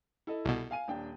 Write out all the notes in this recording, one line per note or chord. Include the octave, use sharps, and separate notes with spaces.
E4 A4 D#5
C2 B2
F5 G#5 D#7
D#1 D4 G5